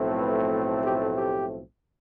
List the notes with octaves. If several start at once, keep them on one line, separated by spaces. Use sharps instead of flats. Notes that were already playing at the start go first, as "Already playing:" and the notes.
Already playing: B1 A2 F3 A3 C4
B4
G4
G4